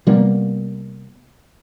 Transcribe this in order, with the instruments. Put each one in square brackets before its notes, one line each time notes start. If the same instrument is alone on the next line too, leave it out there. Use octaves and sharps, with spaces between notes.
[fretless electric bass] C3 G3 A#3 B3